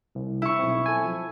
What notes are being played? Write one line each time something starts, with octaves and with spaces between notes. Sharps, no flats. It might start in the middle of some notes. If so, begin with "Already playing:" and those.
C2
E4 C#6
B1 C4
A4 G#5
F3